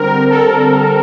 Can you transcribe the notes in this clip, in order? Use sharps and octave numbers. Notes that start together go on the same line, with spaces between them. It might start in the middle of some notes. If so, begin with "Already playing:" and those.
Already playing: D3 G3 C4 A#4
A4